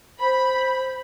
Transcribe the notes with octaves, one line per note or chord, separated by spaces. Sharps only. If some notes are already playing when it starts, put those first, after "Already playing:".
C5 B5